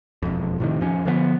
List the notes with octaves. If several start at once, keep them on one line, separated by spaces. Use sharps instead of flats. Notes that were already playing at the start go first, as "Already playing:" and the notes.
E1 F2
A2 C3 D#3
F2 F3 C#4
D3 F3 A3 B3